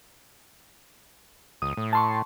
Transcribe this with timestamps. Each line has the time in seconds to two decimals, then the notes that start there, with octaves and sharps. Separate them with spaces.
1.62 C#2 D#6
1.77 A2
1.93 A5 C6 C#6